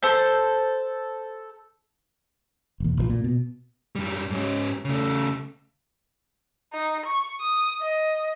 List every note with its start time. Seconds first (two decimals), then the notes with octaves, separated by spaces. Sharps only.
0.03 A4 C5 G6
2.80 E1 D#2
2.97 A#1 D#3 F3
3.09 A#2
3.24 B2
3.95 F#2 G3
4.30 G#2 C#4
4.85 C#3 A3
6.73 D#4
7.06 C#6
7.40 D#6
7.81 D#5